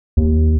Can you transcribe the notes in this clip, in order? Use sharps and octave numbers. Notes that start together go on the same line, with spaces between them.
D#2